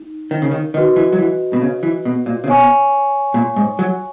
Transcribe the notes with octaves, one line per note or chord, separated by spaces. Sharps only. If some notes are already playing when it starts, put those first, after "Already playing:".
Already playing: D#4
D#3
C#3
D#3
D#3 F#4 B4 D#5
E3
F#3
E3
B2
C#3
E3
B2
A#2
C#3
B2 C#5 G#5 C#6
A#2
G#2
F#3